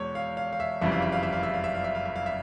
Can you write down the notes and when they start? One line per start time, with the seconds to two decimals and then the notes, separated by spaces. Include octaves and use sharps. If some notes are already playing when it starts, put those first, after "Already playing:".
Already playing: E2 B2 G#3 C#5
0.15 F5
0.37 F5
0.53 F5
0.60 E5
0.81 F#1 F2 C#3 E3 G3 E5
0.92 F5
1.02 E5
1.12 F5
1.23 E5
1.33 F5
1.43 E5
1.54 F5
1.64 E5
1.75 F5
1.84 E5
1.95 F5
2.05 E5
2.16 F5
2.26 E5